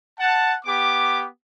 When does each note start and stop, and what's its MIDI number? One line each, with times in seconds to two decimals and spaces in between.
0.19 0.55 78
0.19 0.55 81
0.65 1.26 59
0.65 1.26 67
0.65 1.26 86